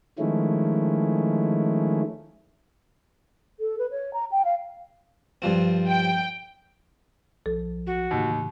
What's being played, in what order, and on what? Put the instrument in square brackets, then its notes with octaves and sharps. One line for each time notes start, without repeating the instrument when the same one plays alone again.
[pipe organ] D#3 F3 G#3 A3 C#4 E4
[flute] A4
B4
C#5
A#5
G5
F5
[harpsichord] G2 F3 C4
[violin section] G5 D7
[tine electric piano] B1 F3 [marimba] A4
[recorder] F#4
[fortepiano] D#2 [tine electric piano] A2 C#3 E3